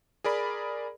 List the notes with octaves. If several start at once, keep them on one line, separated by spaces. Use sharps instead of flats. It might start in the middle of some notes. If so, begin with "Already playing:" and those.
G#4 A#4 D5 B5